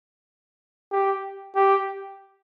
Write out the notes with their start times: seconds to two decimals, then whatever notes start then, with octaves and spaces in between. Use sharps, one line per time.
0.92 G4
1.56 G4